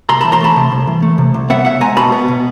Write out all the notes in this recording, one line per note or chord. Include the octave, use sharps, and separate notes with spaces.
C2 A#5 C6
A5 B5
E3
A#5 C6
A3 A5 B5
C3
C2
E3
A3
C3
C2
B3 E5 F#5
B2 E5 F#5
G#3 G#5 A#5
B2 A5 B5
B3
B2